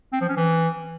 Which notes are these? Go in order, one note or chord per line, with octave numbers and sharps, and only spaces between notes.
C4
F3
C#4
E3